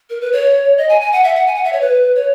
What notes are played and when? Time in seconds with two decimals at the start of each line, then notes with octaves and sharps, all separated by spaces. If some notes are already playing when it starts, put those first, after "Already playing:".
0.10 A#4
0.21 B4
0.33 C#5
0.78 D#5
0.89 G#5
1.01 G#5
1.13 F#5
1.24 E5
1.35 F#5
1.47 G#5
1.55 F#5
1.64 E5
1.73 C#5
1.81 B4
2.16 C#5